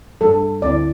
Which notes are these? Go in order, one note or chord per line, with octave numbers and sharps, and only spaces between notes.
G2 G3 D4 A4
D2 D3 C4 E4 D5